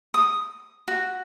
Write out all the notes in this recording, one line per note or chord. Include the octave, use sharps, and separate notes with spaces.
D#6
F#4